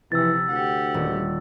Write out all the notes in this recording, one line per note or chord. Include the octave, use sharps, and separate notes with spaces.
C3 E3 F3 E6 A6
D2 G4 F#5
D#1